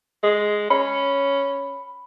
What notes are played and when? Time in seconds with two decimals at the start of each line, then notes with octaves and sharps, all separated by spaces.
0.23 G#3
0.70 C#4 B5